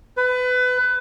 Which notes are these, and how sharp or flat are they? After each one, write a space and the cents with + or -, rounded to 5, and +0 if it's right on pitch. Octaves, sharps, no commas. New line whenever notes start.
B4 +25